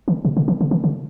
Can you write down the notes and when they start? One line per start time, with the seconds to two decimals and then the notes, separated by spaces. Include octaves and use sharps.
0.08 D#3
0.25 B2
0.37 C#3
0.48 D#3
0.61 C#3
0.71 D#3
0.84 C#3